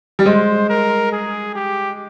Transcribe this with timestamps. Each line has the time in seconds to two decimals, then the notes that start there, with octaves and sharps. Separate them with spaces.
0.19 G3
0.26 G#3 C5
0.70 A#4
1.12 G#4
1.55 G4